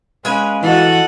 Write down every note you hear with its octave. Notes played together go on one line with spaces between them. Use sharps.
G#3 C#4 B4 F5 G#5
E3 F#4 A4 D#5 F#5